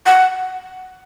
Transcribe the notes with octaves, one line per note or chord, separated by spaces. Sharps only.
F#5